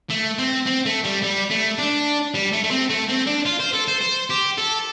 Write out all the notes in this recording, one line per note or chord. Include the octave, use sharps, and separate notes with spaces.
A3
C4
C4
A3
G3
G3
A3
D4
G3
A3
A3
C4
A3
C4
D4
F4
C5
A4
C5
C5
G4
A4